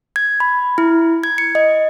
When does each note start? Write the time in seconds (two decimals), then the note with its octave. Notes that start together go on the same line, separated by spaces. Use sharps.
0.16 G#6
0.40 B5
0.78 E4
1.24 G#6
1.38 C#7
1.55 D#5